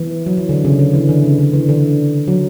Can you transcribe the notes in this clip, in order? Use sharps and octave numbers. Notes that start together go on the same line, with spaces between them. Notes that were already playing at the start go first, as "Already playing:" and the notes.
Already playing: E3
F#3
E3
D3
C#3
D3
E3
D3
C#3
D3
E3
D3
F#3